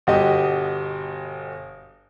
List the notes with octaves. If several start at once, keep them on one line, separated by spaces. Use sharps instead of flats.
G1 B2 F#4 G4 D#5